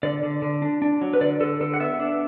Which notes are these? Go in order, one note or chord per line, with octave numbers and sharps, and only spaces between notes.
D3 D5
D3
D3
D4
D4
F#3
B4
D3 D5
D3 A4
D3 A4
F#5
B3 E5
D4